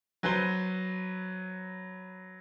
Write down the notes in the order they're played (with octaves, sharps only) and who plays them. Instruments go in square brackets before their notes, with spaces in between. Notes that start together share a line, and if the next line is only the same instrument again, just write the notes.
[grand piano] F#3 B4 C5 G7